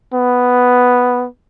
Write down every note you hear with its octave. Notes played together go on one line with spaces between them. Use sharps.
B3